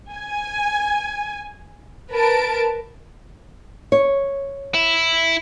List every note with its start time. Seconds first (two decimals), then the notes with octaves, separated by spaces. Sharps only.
0.11 G#5
2.11 A#4 B4 A5 D7
3.92 C#5
4.74 E4